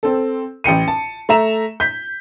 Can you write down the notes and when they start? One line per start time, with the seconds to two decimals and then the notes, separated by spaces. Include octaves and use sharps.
0.03 C4 A4
0.64 A1 G5 C#7 D#7
0.88 A5
1.29 A3 E5 A#5 E7
1.80 G6 B6